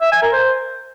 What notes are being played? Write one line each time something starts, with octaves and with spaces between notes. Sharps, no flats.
E5
G#5
A#4
C5